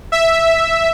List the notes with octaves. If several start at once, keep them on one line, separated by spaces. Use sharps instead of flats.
E5